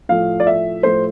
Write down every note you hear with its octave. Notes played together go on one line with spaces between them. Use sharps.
A2 F3 A3 F5
D5
E5
A2 F3 A3 C5